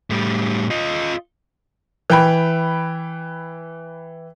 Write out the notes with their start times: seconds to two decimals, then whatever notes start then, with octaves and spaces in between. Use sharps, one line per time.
0.10 A2 G3
0.71 F4 D#5
2.10 E3 G5 B5